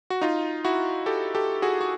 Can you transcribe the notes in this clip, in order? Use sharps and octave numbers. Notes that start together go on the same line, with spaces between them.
F#4
D#4 F4
E4 F#4
G4 A4
G4 A4
F#4 G#4
F#4